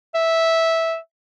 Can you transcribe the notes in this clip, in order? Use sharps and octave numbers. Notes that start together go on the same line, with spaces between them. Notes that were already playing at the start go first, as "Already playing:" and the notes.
E5